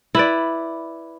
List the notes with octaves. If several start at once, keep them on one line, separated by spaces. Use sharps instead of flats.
E4 B4 D5